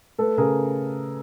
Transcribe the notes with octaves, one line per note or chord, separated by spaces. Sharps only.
A3 A4 B4
C#3 G#4 A#4